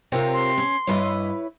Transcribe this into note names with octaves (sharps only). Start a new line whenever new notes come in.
C3 C4 F4 A#4 C#5
C6
C#4
G2 E4 A4 B4 C#5 D#5